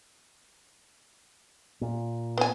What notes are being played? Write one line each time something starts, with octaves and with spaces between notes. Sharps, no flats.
A#2
B3 G#5